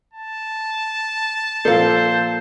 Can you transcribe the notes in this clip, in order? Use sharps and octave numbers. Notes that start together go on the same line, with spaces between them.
A5
A#2 F3 A4 C5 F5